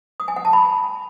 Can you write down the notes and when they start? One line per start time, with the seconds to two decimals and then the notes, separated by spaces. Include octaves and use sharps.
0.20 D#6
0.28 G#5
0.36 F#5
0.45 A5
0.53 B5